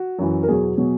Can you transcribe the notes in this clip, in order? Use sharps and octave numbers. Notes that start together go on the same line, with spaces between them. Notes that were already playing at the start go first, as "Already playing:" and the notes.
Already playing: F#4
F#2 E3
A#4
E2 B2 F#3 G#4
B2 F#3